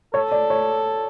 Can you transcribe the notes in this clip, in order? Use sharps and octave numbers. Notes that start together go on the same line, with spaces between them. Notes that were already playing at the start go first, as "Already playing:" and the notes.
A4 C#5
D5
C#5